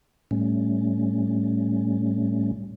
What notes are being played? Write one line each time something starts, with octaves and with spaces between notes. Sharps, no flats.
A2 G3 A3 C#4